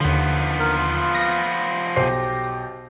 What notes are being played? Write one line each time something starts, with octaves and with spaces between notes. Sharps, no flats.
D#2 D3 F3 B3
A#4
F4
A#6
B1 G4 C5 C7